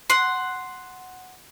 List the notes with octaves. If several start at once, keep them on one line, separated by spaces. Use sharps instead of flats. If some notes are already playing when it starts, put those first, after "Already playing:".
F#5 C6